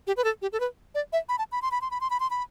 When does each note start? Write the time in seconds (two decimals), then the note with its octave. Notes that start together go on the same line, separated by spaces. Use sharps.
0.07 G4
0.17 B4
0.24 A4
0.42 G4
0.53 A4
0.60 B4
0.95 D5
1.13 E5
1.29 B5
1.39 A5
1.52 B5
1.62 C6
1.71 B5
1.81 C6
1.91 B5
2.01 C6
2.10 B5
2.20 C6
2.30 B5